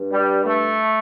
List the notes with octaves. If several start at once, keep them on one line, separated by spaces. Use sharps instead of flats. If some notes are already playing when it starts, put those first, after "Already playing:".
Already playing: G2
G3
A3